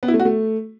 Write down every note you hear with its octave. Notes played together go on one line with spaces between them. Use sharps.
B3
E4
A3
F#4
A3